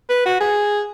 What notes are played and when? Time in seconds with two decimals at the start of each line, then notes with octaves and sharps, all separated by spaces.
0.09 B4
0.26 F#4
0.40 G#4